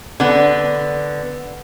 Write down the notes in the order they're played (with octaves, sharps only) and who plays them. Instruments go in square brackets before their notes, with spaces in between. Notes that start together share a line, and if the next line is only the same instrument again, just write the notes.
[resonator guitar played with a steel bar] D3 B3